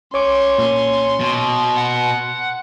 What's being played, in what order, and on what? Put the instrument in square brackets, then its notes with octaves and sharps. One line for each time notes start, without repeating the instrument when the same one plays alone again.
[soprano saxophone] C#4 [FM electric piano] C#5 D6 [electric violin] C6
[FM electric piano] A#2
[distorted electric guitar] B2
[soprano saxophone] F#5